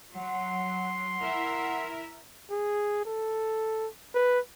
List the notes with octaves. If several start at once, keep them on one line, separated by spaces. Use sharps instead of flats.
F#3 F#5 C6
E4 A#4 E5
G#4
A4
B4